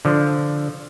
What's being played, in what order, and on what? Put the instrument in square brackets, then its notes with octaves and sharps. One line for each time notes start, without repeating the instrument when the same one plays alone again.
[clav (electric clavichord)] D3 F3